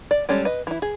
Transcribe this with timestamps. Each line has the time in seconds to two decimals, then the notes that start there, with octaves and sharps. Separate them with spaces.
0.11 D5
0.29 G3 G#3 C#4 A4
0.45 B4 D#5
0.67 E3 E4
0.82 G#4